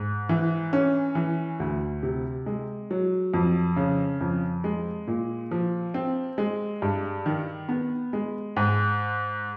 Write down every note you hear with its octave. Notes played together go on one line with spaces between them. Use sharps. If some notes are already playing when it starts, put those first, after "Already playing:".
Already playing: G#2
E3
C#4
E3
D2
C3
G#3
F#3
F2
C#3
F2
G#3
A#2
F3
C4
G#3
G2
D#3
B3
G#3
G#2